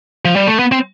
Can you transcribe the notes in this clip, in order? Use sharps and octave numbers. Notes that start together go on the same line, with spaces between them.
F3
G3
A3
B3
C4